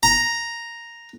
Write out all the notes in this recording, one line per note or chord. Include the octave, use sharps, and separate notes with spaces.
A#5